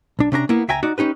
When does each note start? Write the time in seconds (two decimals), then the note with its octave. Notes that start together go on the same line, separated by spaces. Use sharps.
0.19 B1 D4
0.32 C3 C#4 D4 A#5
0.49 A#3 B3 E4
0.68 C#2 E5 G5 G#5 A#5
0.83 D#4 F#4 D5
0.98 C#4 D#4 G4 B4